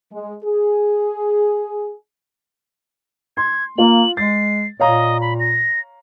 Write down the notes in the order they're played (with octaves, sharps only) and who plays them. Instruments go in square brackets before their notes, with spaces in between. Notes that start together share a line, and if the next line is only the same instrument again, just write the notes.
[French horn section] G#3
G#4
[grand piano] C6 [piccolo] G#6
[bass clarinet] A#3 [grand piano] F4 [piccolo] F#7
[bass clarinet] G#3 [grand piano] A6 [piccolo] C7
[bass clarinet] A#2 [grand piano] C#5 F5 A#5 [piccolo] D#5
[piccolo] B5
A#6